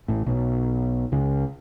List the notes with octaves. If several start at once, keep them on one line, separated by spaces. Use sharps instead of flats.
A1 A2
B1 B2
C#2 C#3